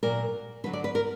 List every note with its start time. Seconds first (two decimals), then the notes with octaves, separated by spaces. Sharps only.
0.03 A#2 F#3 A#4
0.64 D3 F#3 B4
0.73 D5
0.84 B4
0.95 A#4